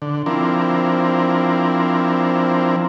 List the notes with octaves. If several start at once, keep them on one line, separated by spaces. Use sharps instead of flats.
D3
F3 C4 D4 E4 A#4